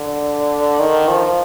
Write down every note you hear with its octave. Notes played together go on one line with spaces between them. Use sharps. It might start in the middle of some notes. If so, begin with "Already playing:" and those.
Already playing: D3
D#3
F3